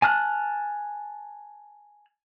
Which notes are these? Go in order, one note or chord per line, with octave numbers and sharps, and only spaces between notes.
G#5 A5 F6 F#6